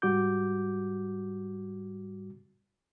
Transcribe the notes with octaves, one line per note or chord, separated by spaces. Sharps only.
G#2 G3 F#4 D6 G6